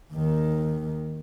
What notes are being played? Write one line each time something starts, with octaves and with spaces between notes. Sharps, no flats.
D#2 D#3